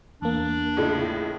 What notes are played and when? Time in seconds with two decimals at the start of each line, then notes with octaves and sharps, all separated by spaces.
0.22 E2 A#3 D4
0.77 A2 C#3 G#3